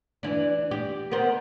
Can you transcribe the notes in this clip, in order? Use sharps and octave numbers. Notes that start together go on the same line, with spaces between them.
E3 D4
G4
B3 A#4 C5